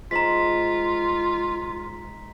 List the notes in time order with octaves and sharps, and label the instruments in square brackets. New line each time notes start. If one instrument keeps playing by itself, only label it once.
[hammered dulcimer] G#2 [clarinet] F4 [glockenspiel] A#5 C6 B6